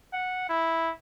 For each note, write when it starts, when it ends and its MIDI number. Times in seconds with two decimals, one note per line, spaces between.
0.13 0.45 78
0.49 0.91 64